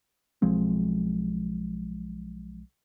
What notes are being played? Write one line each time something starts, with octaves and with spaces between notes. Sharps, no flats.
B1 F3 G#3 C4